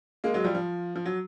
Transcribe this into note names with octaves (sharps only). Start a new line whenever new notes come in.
G#3 A#3
F#3 G#3
F3 G3
F3
F3
F#3